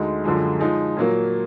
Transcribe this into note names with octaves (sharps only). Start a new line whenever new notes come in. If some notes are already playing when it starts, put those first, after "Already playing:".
Already playing: D2 D3 G#3 D#4
F#2 D3 F3 G#3
F3 G#3 D#4
A#2 F#3 A#3